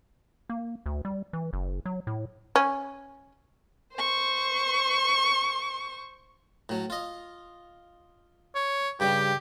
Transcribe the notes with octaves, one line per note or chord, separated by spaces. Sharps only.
A#3
D2
G3
E3
F#1
F#3
A2
C#4
C5 C#6
A2 F#3
F4 D#5
C#5
G2 C#3 G3 G4